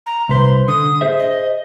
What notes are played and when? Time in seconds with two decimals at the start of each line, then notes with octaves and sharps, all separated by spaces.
0.06 A#5
0.29 C2 B4 C5 C6
0.68 D3 D#6
1.01 G#4 C5 E5
1.19 D#5